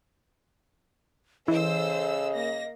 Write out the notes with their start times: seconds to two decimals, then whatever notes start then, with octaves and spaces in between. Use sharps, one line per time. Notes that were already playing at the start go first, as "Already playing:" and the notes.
1.48 C#3 E3 A4 C5 D#5 E6
2.34 A#3 A#6